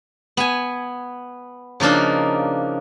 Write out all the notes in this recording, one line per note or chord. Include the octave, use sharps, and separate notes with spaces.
B3 G#5
C#3 F3 A#3 D4 D#4